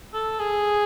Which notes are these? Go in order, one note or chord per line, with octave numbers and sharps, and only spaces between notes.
A4
G#4